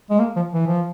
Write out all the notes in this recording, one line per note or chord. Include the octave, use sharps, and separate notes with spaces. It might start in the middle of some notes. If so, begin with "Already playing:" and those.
G#3
A#3
F3
E3
F3